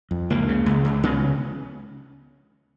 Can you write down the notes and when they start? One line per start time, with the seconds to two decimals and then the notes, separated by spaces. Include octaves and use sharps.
0.11 F2
0.30 C#2 A#3
0.49 C#3
0.66 C#2
0.85 C#2
1.03 C#3 B3